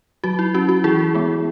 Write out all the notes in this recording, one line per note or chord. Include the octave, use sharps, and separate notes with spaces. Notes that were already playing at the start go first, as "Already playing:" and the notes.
F#3 F#4
E4
C#4 F#4
F#4
E3 E4 G#4
G#3 B3